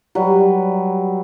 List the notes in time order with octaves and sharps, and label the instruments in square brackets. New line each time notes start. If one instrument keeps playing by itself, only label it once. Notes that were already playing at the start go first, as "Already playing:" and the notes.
[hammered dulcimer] F#3 G3 B4